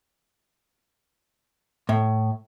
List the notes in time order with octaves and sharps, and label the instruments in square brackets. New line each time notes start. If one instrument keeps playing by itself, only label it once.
[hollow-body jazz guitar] A2